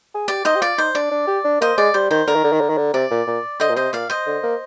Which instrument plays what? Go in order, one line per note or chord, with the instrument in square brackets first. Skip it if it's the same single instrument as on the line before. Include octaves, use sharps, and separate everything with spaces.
[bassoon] G#4
[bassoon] G4 [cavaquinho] D5
[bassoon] D#4 [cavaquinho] C5 D#5
[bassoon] G4
[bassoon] F4 [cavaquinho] D5
[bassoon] D#4 [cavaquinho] C5
[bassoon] D4 [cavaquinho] D5
[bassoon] D4
G4
D4
[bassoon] A#3 [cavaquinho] C5 D#5
[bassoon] G#3 [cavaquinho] D5
[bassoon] G3 [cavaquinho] C5
[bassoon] D#3 [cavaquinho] C5
[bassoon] D3 [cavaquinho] A#4
[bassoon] D#3
D3
D#3
D3
D#3
D3
[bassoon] C3 [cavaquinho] D5
[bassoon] A#2
A#2
[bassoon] D3 [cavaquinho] C5 D#5
[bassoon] A#2
[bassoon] C3 [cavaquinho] C5 D#5
[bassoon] A#2 [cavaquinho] D5 F5
[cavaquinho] C5 D#5
[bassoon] D3
A#3